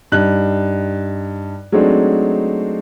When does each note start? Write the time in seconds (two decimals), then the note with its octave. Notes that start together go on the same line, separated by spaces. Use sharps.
0.12 G2 D#4 F#6
1.72 F#3 G#3 A3 C4 D4 D#4